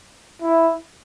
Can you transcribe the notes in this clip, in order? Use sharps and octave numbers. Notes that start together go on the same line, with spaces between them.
E4